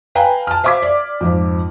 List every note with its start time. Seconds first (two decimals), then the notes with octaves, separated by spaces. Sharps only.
0.15 B4 F5 G5 G#5 A#5
0.47 A5 F6
0.64 C5 E5 F5 D6 G#6 B6
0.82 D5
1.21 F2 G#2 F3